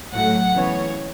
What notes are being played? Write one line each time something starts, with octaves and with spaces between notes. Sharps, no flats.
A2 F#3 A3 F#5
C#3 E3 B3 C#5